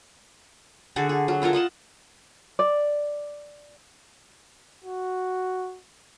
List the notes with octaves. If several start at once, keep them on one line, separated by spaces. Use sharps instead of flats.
D3 F#4 G#4 A4
G#4
F#3
E4 F4 A4 A#4
F4 D#5 F#5 A5
D5
F#4